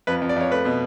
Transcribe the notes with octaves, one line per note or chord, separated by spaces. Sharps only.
F2 B4
F2
D5
F2 C#5
A3 B4
B2